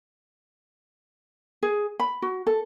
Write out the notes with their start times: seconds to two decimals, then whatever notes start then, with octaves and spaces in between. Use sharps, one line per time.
1.63 G#4
2.00 B5
2.22 F#4
2.47 A4